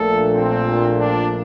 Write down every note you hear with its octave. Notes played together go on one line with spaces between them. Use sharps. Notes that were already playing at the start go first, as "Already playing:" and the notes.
Already playing: A#1 A#2 A3 A4
C4
D4